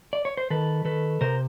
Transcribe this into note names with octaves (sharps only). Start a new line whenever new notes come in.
D5
C#5
C5
D#3 A4 B4
D#3 A4 B4
C3 A#4 C5